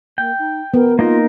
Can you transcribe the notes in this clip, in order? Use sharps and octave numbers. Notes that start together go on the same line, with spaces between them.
A#3 G5
D#4
B3 A#4
A#3 D#4 F4 A#4